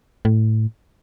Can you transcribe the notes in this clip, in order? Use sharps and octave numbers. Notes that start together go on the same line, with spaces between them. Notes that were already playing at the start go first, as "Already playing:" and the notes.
A2